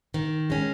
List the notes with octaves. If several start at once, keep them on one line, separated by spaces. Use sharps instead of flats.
D#3
G#3 C#4